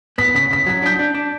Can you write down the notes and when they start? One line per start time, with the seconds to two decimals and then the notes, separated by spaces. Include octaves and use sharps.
0.18 B3 B6
0.35 C#3 B6
0.51 C#3 B6
0.67 F#3 B6
0.82 D4 G6 B6
0.99 D4
1.15 D4